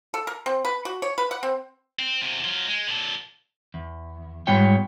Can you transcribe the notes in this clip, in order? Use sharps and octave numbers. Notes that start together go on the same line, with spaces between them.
A4
A#4
C4
B4
F#4
C#5
B4
F#5
C4
C4
E2 C3
F#3 F4
G#3
A#2 A4
E2
G#2 G3 B3 F4 C#5 G5